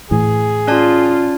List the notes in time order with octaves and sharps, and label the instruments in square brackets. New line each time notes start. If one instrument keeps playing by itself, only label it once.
[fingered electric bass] A2 E3 [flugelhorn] G#4
[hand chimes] C#4 D5 A5 [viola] F4